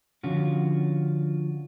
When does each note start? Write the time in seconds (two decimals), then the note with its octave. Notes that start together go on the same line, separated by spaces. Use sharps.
0.23 D3 F3 C#4 F4 F#4